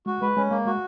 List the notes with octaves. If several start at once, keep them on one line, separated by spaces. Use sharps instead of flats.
G#3 F#4
G#3 B4
G#3 C#4
G#3 A#3
G#3 F#4